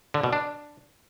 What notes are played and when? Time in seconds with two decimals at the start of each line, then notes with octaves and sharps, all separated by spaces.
0.14 D3
0.23 B2
0.33 D4